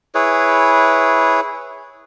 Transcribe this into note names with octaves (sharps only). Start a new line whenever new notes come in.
E4 G#4 B4 C#5